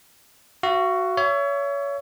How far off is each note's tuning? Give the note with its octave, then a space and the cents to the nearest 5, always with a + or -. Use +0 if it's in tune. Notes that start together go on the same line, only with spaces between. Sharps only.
F#4 +5 F5 -40
C#5 +25 E5 +30